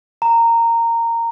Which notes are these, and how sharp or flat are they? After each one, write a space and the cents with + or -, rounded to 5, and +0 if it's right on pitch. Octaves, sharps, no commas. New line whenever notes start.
A#5 -15